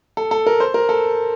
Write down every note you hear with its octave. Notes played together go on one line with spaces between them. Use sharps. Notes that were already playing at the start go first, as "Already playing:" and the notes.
A4
A4
A#4
C5
A#4
A4